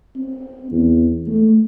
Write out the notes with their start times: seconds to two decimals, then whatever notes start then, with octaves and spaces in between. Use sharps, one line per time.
0.17 C4
0.71 E2
1.27 A3